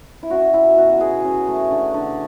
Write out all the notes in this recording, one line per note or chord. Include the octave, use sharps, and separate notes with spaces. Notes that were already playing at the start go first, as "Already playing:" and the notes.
E4
C#4 F#4
F#3 E4
B2 F#4
B2 G#4
C#4
A3
D3
D3